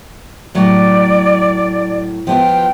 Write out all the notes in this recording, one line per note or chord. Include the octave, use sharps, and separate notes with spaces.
A2 F#3 D5
F3 B3 F4 G5